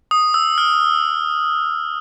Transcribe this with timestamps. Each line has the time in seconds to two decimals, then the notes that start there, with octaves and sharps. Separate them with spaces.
0.11 D#6
0.34 E6
0.58 F6